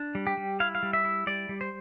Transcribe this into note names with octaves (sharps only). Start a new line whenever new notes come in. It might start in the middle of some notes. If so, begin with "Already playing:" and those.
Already playing: D4
G3
G4
G3
E4 F5
F5
G3
E5
E4
G3 D5
G3
C5